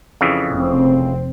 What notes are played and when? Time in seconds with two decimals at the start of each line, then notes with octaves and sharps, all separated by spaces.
0.21 F2 C#3 E3
0.52 F1 C4